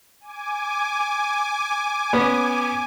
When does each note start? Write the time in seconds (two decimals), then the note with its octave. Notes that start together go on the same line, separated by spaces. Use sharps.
0.20 G#5 D6
2.13 B3 C#4